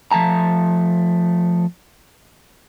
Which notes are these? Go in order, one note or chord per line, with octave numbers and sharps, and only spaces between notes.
F3 A3 A5 A#5